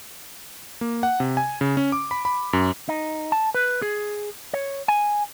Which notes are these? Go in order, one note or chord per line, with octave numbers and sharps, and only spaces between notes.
A#3
F#5
C3
G#5
C#3
C#4
D6
B5
B5
F#2
D#4
A5
B4
G#4
C#5
G#5